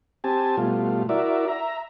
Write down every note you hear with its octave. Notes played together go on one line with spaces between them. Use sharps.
C4 G4 G#5 A5
B2 G3 A3 F4
E4 F#4 A#4 D5 E5
E5 A#5